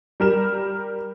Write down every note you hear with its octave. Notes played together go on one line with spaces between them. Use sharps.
G3 A#4 E7